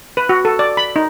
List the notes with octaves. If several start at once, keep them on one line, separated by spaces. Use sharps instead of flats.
B4
F#4
A4
D5
B5
D#4